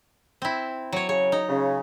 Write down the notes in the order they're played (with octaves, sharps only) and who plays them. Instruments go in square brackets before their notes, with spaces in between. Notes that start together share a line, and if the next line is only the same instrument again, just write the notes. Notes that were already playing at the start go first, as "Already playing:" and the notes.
[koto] C4 E4
F#3 C#5
[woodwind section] C#3 [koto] C#5
[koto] D#4
[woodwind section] C#3